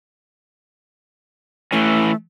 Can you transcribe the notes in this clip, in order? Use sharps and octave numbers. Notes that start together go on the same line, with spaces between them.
E3 A3 C#4